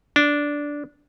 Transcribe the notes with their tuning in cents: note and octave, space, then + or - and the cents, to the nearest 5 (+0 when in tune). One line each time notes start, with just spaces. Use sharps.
D4 -10